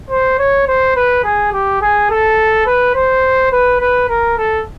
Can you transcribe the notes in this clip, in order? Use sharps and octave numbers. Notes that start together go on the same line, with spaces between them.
C5
C#5
C5
B4
G#4
G4
G#4
A4
B4
C5
B4
B4
A#4
A4